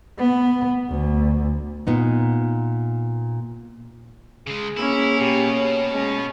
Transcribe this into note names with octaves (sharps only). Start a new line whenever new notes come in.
B3
D2
A#2 B3 D#4
C#3 G#3 G#4
A#3 C#4 E4
B2 G4
C#5
G#3 C#4